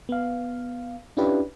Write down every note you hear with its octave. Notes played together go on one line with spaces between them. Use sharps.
B3 F5
C#4 D4 E4 F4 G4 B4